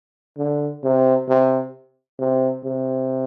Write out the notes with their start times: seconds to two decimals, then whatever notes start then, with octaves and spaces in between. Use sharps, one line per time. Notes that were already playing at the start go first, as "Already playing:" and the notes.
0.38 D3
0.84 C3
1.28 C3
2.19 C3
2.64 C3